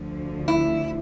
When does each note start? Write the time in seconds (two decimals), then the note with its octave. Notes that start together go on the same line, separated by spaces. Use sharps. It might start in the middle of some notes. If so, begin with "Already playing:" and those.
Already playing: D2 D3 F3
0.48 E4